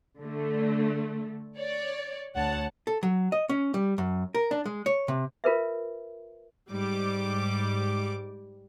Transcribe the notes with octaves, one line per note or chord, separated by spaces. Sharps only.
D3 A3
C#5 D5
D2 C#5 F#5 A5
A4
F#3
D#5
C#4
G3
F#2
A#4
D4
G#3
C#5
C3
F4 A#4 B4 E5
G#2 G3 D6